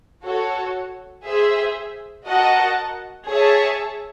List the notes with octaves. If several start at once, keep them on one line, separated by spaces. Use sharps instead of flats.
F#4 A4 C#5
G#4 C5 E5
F#4 A#4 D#5 F#5 A5
G#4 C#5 E5 A5